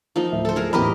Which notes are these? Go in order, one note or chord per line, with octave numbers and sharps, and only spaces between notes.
F3 A#3 D#4
D1 E5
A4 C5
G#4 A#4
A1 E2 G4 A#4 D#5 B5